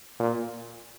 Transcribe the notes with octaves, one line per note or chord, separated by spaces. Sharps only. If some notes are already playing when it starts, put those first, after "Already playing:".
A#2